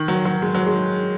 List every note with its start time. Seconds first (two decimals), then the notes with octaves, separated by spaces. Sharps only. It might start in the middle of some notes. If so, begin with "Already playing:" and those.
Already playing: D#3
0.08 F#3
0.25 F#3
0.42 G#3
0.55 F#3
0.67 G#3